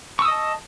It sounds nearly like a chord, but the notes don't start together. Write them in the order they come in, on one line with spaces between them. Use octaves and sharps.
C#6 E6 D#6 D#5 A5